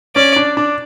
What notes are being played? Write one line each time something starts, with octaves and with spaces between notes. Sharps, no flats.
C#4 D5
D4
D4